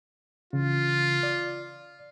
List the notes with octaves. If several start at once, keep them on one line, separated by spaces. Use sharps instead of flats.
C#3 E3 F4
D5